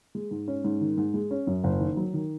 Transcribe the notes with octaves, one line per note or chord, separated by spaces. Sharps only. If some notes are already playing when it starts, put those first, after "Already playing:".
G#3
G#2
C#4
G#2
D#3
G#2
G#3
C#4
F#2
F#1
D#3
F#3
D#3